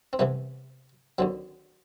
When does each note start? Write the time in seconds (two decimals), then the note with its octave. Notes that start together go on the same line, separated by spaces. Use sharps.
0.13 C4
0.19 C2 C3 E3 B3
1.19 D#2 D3 F#3 C4